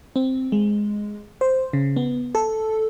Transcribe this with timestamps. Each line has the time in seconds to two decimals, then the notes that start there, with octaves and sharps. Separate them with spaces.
0.16 C4
0.52 G#3
1.41 C5
1.73 C#3
1.96 B3
2.35 A4